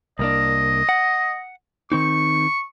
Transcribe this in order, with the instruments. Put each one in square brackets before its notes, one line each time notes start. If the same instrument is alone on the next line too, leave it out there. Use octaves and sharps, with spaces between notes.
[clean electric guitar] C2 A#3 D4 [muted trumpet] D#5
[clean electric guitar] F#5
[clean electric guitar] D#3 C4 D#4 [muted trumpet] C#6